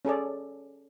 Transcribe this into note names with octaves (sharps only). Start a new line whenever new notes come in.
C#4 G#4 A4 D5